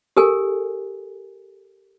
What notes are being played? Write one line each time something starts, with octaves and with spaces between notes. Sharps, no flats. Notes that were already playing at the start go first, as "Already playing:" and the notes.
G4 A4 A#4 G#5